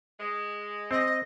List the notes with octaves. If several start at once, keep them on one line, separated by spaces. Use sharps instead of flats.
G#3
C4 D#5